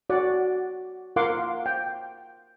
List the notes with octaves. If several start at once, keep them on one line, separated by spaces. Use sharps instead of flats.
F#4 D5 F#5
F4 A#4 F5 F#5 C6 D6
G5